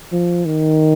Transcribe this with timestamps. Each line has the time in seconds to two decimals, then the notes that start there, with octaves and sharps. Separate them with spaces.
0.12 F3
0.46 D#3